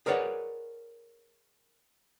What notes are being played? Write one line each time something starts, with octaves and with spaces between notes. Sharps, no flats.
G#4 A#4 B4 C#5 D5 F#5